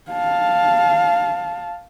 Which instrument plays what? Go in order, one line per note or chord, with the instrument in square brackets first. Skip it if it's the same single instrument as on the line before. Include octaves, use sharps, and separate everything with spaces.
[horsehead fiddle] F5 A5